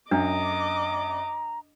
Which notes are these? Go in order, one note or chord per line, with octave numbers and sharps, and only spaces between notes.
F#2 D4 D#5 A#5 D6